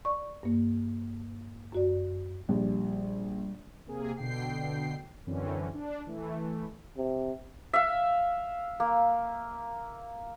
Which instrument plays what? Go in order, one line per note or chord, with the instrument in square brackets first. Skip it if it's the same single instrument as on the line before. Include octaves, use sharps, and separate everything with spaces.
[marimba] D5 C#6
G2 A#3
F#2 F#4 D5
[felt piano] A#1 [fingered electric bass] G3
[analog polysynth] C3 A#3 G#4
B2 D3 G5 C7
F#2 D3 E3 C4 C#4
D4
E3 A3
[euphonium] C3
[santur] E5 F5
A#3